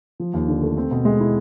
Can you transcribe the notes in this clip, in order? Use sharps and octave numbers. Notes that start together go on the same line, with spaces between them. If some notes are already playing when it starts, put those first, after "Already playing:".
F3
D#2
D3
A3
C4
B2
G#3
E4